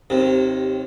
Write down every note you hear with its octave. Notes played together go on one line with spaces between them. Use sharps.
D#2 C3